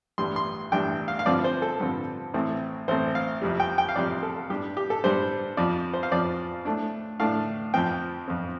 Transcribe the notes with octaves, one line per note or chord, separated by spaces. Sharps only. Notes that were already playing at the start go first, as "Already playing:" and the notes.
A1 G2 G3 D4 C6
C6
A1 G2 G3 D4 G5
F5
F5
G2 D3 F3 C4 D5
C5
A4
G2 D3 F3 C4
A1 A2 A3 C4
A1 A2 A3 C4 C5
F5
F2 C3 G3
G5
G5
F5
F2 C3 G3 D5
A4
G2 G3 D4 G4
G4
A4
G2 G3 D4 C5
F2 F3 C4 D5
C5
F5
F2 F3 C4 D5
A2 A3 D4
A2 A3 D4 F5
F2 F3 C4 G5
F2 F3 C4